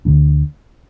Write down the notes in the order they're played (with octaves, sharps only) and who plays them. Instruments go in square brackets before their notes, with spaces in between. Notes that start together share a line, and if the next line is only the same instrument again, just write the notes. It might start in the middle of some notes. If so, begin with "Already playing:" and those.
[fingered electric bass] D2 D3 G3 D4